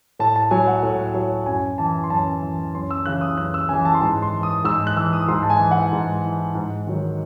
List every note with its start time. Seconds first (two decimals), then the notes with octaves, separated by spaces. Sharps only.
0.19 A2 A5
0.36 A5
0.51 F#3 G#5
0.68 F#5
0.83 A2
1.15 F#3
1.46 F#2 G#5
1.78 E3 A5
2.04 C6
2.10 F#2 A5
2.43 E3
2.75 F#2 C6
2.91 E6
3.06 C#3 E3 F#6
3.21 D#6
3.37 F#2 F#6
3.54 E6
3.69 C#3 E3 G#5
3.85 A5
3.94 C6
4.01 G#2 A5
4.22 C6
4.33 E3
4.43 D#6
4.64 G#2 E6
4.87 F#6
4.96 E3 E6
5.13 D#6
5.28 G#2 C6
5.43 A5
5.50 G#5
5.60 E3
5.71 F#5
5.93 G#2
6.24 E3
6.55 G#2
6.87 D#3 F#3